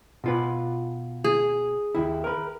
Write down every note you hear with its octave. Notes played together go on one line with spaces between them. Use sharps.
B2 F4 B4
G#4
D#2 E4
A#4 B4